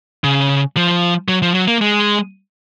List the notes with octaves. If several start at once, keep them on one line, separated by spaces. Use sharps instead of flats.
C#3
F3
F#3
F3
F#3
A#3
G#3